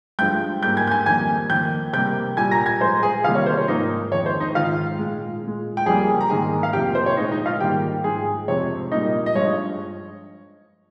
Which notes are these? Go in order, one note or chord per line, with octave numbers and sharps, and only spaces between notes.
G2 F3 G#3 G5 G6
G#2 G3 A#3 G5 G6
G#5 G#6
G6
G#5 G#6
F2 D#3 G3 A#3 G#5 G#6
F2 D#3 A#3 G5 G6
C3 G3 A#3 G5 G6
A#2 G3 A#3 G#5 G#6
A#5 A#6
G#5 G#6
A#2 F3 G#3 C5 C6
G#4 G#5
C3 D#3 G3 A#3 F4 F5
C#5
C5
C#5
G#2 F3 A#3 D#4 D#5
F2 D#3 G#3 C#5
C5
D#4 D#5
G#2 D#3 G#3 F4 F5
A#2 G#3
A#2 G#3
G5
F2 C#3 G3 A#3 G#4 G#5
A#5
G#2 D#3 A#3 G#4 G#5
F5
F2 C3 F3 A#3 G4 G5
C5
C#5
A#2 G#3 D#4 D#5
D#4 D#5
F4 F5
G#2 D#3 G3 A#3 G4 G5
G#2 F3 G#3 G#4 G#5
F2 C3 F3 G#3 C#5
A#2 G3 A#3 D#4 D#5
D#5
G2 F3 G#3 C#5